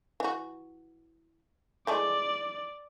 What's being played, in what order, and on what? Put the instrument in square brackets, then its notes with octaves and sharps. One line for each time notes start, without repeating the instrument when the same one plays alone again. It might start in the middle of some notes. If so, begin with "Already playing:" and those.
[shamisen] E3 F#4
[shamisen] E3 G#3 A3 [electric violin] D5